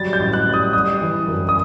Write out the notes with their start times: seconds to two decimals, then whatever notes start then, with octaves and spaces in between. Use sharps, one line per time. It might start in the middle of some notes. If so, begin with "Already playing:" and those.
Already playing: F#3 G3 A6
0.13 G6
0.20 A1
0.33 F#6
0.47 G3
0.54 D#6
0.73 G3 D#6
1.02 E3
1.27 F#2
1.49 D#6